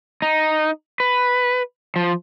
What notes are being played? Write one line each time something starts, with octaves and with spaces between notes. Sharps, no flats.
D#4
B4
F3